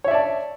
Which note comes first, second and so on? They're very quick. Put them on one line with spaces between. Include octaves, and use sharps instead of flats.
C#5 E5 D5 A5